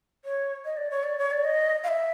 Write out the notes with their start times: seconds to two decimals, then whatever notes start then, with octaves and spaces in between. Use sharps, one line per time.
0.25 C#5
0.65 D#5
0.77 D5
0.90 C#5
1.04 D5
1.18 C#5
1.31 D5
1.44 D#5
1.84 F5
1.88 E5